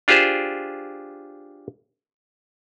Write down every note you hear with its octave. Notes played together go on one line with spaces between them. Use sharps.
D4 F4 G4 G#4 C5